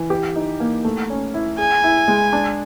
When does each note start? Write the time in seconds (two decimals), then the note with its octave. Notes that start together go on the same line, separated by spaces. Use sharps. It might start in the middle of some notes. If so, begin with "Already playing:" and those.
Already playing: E3
0.10 G4
0.36 D#4
0.60 A#3
0.85 A3
1.10 C#4
1.34 E4
1.58 G#4 G#5
1.84 E4
2.08 G#3
2.33 D4